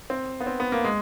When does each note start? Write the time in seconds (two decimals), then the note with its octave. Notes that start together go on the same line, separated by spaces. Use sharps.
0.10 C4
0.40 B3
0.47 C4
0.60 B3
0.72 A#3
0.84 G#3